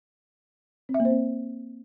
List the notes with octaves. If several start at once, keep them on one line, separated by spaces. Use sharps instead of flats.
C4
E5
A#3
C5
C4